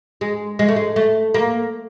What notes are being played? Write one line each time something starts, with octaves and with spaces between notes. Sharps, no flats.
G#3
G#3
A3
G#3
A3
A#3